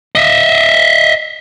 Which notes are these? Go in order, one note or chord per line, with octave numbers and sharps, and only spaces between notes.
D#5 E5